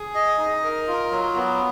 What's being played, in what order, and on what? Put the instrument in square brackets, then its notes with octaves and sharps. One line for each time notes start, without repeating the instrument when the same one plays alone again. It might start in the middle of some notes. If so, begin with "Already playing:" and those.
Already playing: [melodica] G#4
D#5
D#4
A#4
F4
F#3
B3